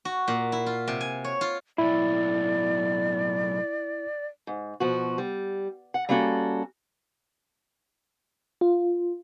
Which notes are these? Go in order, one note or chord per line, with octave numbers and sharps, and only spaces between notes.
F#4
A#2
E4
F4
C3
G#5
C#5
F4
B1 A2 E4 D5
G#2
B2 F3 F#4
G3
F#5
G3 A#3 C#4 F#4 A4
F4